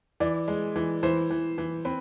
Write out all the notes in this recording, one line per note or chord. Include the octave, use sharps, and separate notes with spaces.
E3 D5
G#3
E3
E3 C5
E3
E3
C4 B4